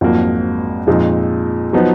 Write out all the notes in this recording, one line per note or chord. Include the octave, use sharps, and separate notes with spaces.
G#1 F2 G#2 F3 F#3 A#3
F2 A#2 F3 G#3 D#4
F3 F#3 B3 D#4